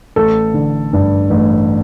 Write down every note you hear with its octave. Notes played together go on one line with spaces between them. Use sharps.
A1 A4
D3
G2
A1